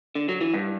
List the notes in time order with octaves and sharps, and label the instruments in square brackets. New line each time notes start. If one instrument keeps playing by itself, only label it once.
[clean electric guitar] D3
F#3
E3
G2